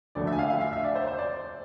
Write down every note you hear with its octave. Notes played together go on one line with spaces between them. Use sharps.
D2 D3 F3 A3 D5
E5
G#5
F5
F5
E5
E5
D5
C5
C5
D5